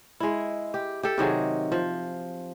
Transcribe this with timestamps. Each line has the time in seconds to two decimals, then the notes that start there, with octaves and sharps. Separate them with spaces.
0.20 G#3 E4
0.74 G4
1.03 G4 A4
1.18 C3 D#3 F#3 G#4
1.72 F3